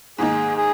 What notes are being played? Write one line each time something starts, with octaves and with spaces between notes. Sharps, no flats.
G#2 D#3 A#3 D#4 G#4
G#4